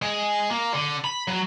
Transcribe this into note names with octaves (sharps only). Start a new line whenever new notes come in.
G#3
A#3
D3
B5
F#3